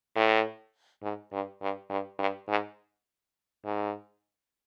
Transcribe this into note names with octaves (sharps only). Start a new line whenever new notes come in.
A2
G#2
G2
G2
G2
G2
G#2
G#2